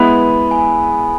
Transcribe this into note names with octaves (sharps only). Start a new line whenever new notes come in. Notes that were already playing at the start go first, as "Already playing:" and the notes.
Already playing: G#3 B3 E4 B4 B5
G#5